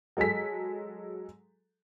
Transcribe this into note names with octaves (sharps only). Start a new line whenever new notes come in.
F#3 G#3 A4 G#5 B6